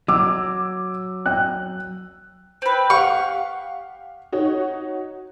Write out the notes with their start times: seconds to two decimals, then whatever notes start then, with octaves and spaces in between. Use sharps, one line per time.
0.08 F#3 D6 E6
1.26 G5 F#6
2.62 C4 B4
2.90 G4 F5 F#5 C#6
4.32 D#4 F#4 C#5